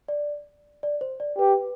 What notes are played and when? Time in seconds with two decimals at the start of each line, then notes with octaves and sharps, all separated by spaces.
0.08 D5
0.83 D5
1.01 C5
1.20 D5
1.38 G4 B4